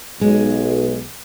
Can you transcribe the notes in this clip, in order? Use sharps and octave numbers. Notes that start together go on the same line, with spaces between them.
B1 G#3